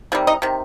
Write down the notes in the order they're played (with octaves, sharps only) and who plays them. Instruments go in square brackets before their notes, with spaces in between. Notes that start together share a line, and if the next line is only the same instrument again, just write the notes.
[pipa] C3 D#3 G3
D#4 D#5
C3 D#3